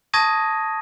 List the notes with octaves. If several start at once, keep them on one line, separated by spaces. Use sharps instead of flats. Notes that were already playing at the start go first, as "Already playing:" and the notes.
A5 C#6 D#6 G#6 A#6 D#7